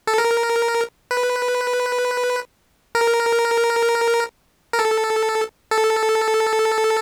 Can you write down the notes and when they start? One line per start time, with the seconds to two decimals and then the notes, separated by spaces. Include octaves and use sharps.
0.07 A4
0.18 A#4
1.11 B4
2.95 A#4
4.73 A#4
4.79 A4
5.71 A4